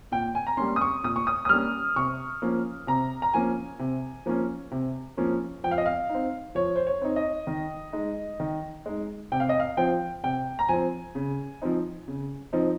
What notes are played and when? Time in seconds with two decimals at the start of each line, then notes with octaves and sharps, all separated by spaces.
0.12 A#2 G5
0.35 G#5
0.47 A#5
0.57 G3 A#3 C#4 C6
0.76 D#6
0.81 C#6
1.04 A#2 D#6
1.16 C#6
1.27 D#6
1.45 D#6
1.49 G3 A#3 C#4 F6
1.96 C3 C#6
2.42 F3 A#3 C#4
2.87 C3 A#5
3.22 A#5
3.34 F3 A#3 C#4 G#5
3.79 C3
4.26 F3 A#3 C#4
4.71 C3
5.17 F3 A#3 C#4
5.64 F3 G5
5.71 F5
5.78 D#5
5.86 F5
6.09 D#4
6.14 C4
6.55 F3 C#5
6.76 C5
6.87 C#5
7.02 C4 D#4
7.16 D#5
7.47 D#3
7.93 G#3 D#4
8.40 D#3
8.86 G#3 D#4
9.32 C3 G5
9.40 F5
9.49 D#5
9.60 F5
9.77 F3 C4 G5
10.24 C3 G5
10.59 A#5
10.69 F3 C4 G#5
11.15 C#3
11.62 F3 C4 D#4
12.08 C#3
12.53 F3 C4 D#4